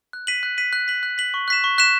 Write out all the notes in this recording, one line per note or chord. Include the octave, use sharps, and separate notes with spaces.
F#6
B6 D#7 F#7
F#6
B6 D#7 F#7
F#6
B6 F#7
F#6
B6 F#7
C#6
F#6 B6 E7
C#6
F#6 B6 E7